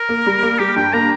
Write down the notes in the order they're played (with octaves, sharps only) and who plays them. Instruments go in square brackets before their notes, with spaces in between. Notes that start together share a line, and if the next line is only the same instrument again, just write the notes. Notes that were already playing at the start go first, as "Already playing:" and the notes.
Already playing: [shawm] A#4
[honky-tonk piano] A#3
G3
A#3
[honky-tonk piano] G3 [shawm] G4
[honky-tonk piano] G2 [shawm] G5
[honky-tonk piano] A#3 [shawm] A#5